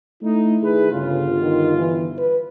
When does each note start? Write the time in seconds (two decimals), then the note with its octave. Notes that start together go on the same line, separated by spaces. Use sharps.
0.23 A3 D#4 E4
0.63 D#3 G#4 B4
0.92 G1 C#3 F4
1.41 D#3
1.77 E3
2.18 B4